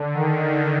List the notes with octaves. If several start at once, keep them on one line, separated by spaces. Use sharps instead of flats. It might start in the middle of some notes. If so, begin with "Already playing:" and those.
Already playing: D3
D#3